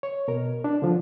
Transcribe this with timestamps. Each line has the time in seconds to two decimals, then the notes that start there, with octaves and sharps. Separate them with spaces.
0.03 C#5
0.28 B2 A#4
0.64 D4
0.82 D3 F3